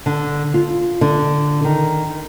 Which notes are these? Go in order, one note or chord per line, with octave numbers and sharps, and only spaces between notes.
D3
F4
D3
D#3